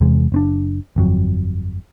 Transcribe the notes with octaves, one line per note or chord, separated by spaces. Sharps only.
E2 C3 G#3
F#1 C4 D4
G1 F2 F#3